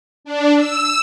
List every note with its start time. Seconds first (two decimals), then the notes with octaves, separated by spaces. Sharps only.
0.24 D4
0.56 E6